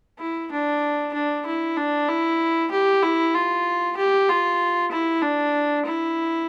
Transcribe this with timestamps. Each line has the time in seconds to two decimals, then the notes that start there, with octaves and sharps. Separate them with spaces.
0.19 E4
0.52 D4
1.14 D4
1.46 E4
1.77 D4
2.09 E4
2.71 G4
3.03 E4
3.34 F4
3.97 G4
4.29 F4
4.92 E4
5.22 D4
5.86 E4